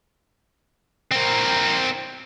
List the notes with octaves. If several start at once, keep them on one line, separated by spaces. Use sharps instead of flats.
C4 A#4